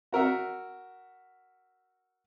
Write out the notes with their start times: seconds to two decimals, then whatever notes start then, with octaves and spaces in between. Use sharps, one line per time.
0.12 F#4 A#4 E5 F#5